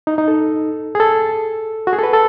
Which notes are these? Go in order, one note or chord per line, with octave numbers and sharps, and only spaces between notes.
D#4
D#4
A4
G#4
A4
F#4
G#4
A4
B4
A4